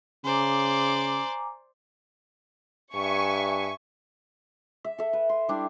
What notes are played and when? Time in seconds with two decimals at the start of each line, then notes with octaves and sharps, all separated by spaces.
0.25 C#3 C5 D5 G#5 A#5 D6
2.95 G2 E5 G#5 C#6
4.85 E5
4.98 A4 E5
5.13 B4
5.29 C6
5.48 G3 D4 E4 G4